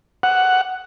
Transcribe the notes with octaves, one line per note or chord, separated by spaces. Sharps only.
F#5